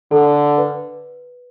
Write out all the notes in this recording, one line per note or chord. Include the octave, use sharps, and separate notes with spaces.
D3 A4
B4